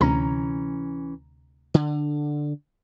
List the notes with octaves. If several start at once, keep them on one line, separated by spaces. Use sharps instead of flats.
D2 C3 E3 C#4 A#5
D3